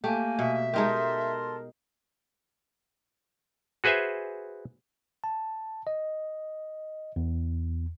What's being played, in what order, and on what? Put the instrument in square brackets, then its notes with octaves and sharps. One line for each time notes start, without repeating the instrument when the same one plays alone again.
[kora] A3 G4 [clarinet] A#3 [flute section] G#5
[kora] B2 [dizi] E5
[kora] G#3 D#4 G4 [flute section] A4 A5 C6 [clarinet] A#4
[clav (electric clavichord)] F#4 G#4 B4 C5 E5 G#5
[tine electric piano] A5
D#5
E2